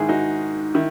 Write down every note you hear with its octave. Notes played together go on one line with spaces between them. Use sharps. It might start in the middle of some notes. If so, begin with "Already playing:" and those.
Already playing: G#2 D#3 G#3 E4 G#4
D#4 F#4
D#3 E4